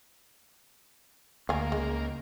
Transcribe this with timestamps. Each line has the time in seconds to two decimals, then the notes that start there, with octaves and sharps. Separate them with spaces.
1.49 D2 A#3 F5 G#5
1.72 C#2 G#3